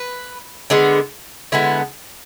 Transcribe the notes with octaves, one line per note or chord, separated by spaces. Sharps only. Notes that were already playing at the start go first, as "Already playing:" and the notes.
Already playing: B4
D3 G#3 B3
D3 G#3 B3 E4